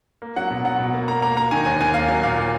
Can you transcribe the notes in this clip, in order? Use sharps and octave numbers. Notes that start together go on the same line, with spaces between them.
A#3
F#3 F#5
B2
F#3 F#5
B2
A#3
A#3 A#5
A#3 A#5
A#3 A#5
D#3 G#5
D#2 G#5
D#2 G#5
A#3 F5
F#3 G#5
A#2 F5
A#3